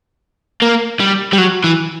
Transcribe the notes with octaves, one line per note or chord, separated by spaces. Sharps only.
A#3
G3
G3
F#3
E3